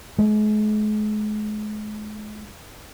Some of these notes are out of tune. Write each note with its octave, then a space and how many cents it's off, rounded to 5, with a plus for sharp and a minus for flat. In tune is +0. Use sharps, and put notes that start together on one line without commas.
G#3 +40